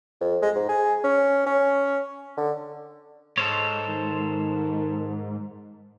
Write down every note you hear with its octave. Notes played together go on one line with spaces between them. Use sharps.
F2
G#3
G#2
G#4
C#4
C#4
D3
G#2 A4 C5 C#5
D#3